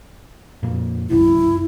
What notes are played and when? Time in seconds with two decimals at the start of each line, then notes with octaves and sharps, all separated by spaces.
0.63 F2 A#2
1.10 G1 C2 F#2 E4